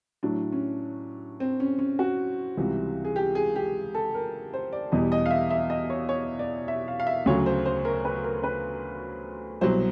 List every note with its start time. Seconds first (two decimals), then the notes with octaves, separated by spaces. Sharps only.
0.23 A2 F#3 D4
0.52 C#4
1.40 C4
1.60 C#4
1.79 C#4
1.99 F#4
2.57 C#2 C3 E3 G3
3.05 G#4
3.16 G4
3.35 G#4
3.56 G4
3.95 A4
4.14 A#4
4.54 C5
4.73 D5
4.92 E2 B2 G3 D#5
5.12 D#5
5.26 F5
5.31 E5
5.51 E5
5.70 D#5
5.90 C#5
6.09 C#5
6.39 D5
6.68 E5
6.88 F5
7.00 F5
7.07 E5
7.26 D2 C#3 F#3 C#5
7.46 C5
7.65 C5
7.85 A#4
8.05 B4
8.24 A#4
8.44 B4
9.61 C2 B2 F#3 C5